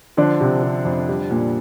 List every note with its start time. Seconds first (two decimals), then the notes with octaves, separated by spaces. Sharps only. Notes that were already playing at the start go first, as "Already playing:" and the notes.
0.17 D3 F3 D4
0.41 C3
0.63 C3
0.85 F2
1.09 G3
1.31 A#2